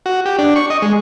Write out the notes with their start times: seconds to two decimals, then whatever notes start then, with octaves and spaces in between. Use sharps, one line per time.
0.06 F#4
0.26 G4
0.39 D4
0.56 C#6
0.70 D#5
0.82 G#3